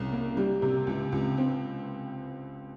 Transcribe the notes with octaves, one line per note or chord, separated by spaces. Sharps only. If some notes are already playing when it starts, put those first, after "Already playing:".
Already playing: C2 C#3
A#3
G3
C3
C#2
C#2
C4